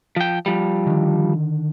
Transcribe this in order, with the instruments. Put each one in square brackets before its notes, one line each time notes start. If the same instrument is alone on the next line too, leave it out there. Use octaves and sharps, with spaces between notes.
[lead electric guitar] F3 G5
F3 G3
[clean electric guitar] D3 D#3